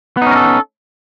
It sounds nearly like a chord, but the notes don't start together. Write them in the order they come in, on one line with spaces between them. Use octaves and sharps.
B3 D#4 C#4 A#4 A4